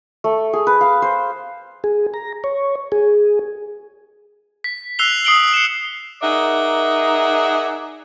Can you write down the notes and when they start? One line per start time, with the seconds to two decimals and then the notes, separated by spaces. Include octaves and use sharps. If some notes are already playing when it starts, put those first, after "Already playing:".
0.24 A3
0.53 G#4
0.67 B4
0.81 F5
1.02 C5
1.84 G#4
2.14 A#5
2.44 C#5
2.92 G#4
4.64 B6
4.99 E6 F#6 C7 F7 G7
5.24 D#6 C7 D7 F#7 G7
5.54 C#7 E7
6.22 D#4 G#4 A#4 D5 E5 F#5